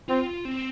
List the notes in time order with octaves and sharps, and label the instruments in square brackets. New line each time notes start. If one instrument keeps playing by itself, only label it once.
[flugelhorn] C4 [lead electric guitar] F4
[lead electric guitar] C4